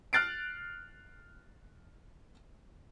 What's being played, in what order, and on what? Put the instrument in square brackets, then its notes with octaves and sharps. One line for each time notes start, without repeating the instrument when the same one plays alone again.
[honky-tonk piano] F6 F#6 A6 C7 D7